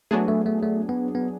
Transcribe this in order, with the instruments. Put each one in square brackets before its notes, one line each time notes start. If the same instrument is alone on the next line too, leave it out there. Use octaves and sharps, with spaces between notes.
[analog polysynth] F#3 B3 D4 G#4 [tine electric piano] A3
[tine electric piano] A3
A3
A3
B3
B3